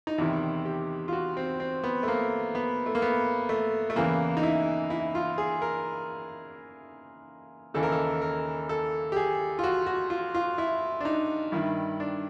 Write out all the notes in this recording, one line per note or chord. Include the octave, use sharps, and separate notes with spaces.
D#4
E2 C3 D#3 E4
G4
F4
F#4
C4
C4
B3
A3
A#3
B3
A3
A#3
B3
A3
A3
E2 C#3 E3 A#3
D#4
E4
E4
F4
G#4
A#4
D#2 C#3 E3 A4
A#4
A4
A#4
A4
G4
G#4
F4
F#4
F#4
F4
F4
E4
D4
D#4
G2 D#3 E4
D4